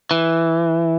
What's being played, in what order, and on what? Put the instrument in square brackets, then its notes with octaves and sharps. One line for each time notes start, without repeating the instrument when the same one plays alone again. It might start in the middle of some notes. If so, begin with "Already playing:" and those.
[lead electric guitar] E3